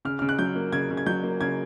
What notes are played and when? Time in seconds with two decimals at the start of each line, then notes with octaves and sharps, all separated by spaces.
0.05 C#3 F6
0.19 C#3 F6
0.29 F#6
0.39 F#3 G6
0.56 A#3
0.72 C#3 G#6
0.90 C#3
0.97 G#6
1.06 F#3 G6
1.23 A#3
1.41 C#3 G#6